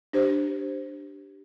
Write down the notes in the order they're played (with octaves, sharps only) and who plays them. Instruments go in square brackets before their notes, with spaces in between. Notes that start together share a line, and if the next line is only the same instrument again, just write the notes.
[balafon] D4 G4 C5